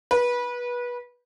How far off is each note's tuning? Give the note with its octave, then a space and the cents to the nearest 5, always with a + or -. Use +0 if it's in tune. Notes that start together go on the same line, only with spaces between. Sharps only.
B4 -25